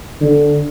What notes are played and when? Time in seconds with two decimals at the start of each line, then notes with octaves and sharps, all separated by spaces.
0.21 D3